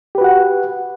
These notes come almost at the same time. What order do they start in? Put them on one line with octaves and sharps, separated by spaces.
G4 B4 F#4 F#5